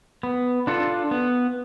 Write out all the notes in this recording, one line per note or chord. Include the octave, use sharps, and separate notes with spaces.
B3
D4 F4 A4
B3